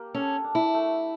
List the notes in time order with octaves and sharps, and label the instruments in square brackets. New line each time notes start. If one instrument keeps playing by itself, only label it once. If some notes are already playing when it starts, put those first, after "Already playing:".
Already playing: [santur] A#3 G4
[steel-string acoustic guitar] C#4 [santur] A4
[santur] D4
[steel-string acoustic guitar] E4
[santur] A3